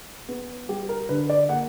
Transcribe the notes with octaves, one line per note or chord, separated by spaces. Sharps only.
B3
G3 G4
A#4
D3 B4
D5
A#3 F#5